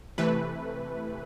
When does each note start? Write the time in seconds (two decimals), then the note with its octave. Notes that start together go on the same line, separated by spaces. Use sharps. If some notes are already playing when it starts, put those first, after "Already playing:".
0.18 C3 E3 A3 B4